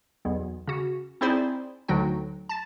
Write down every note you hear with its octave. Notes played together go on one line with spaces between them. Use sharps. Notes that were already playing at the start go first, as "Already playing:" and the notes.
B1 E2
C#3 F#4
C4 D#4 E4 G#4 C5 D5
D2 D3 F#3 D#4 G5
A5 A6